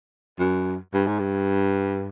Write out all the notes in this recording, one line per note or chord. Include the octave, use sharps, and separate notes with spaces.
F#2
G2
G#2
G2